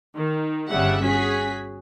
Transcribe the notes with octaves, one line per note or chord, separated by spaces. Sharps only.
D#3
G1 C#3 G3 E5 F#5
C#4 F#4 G#4 B6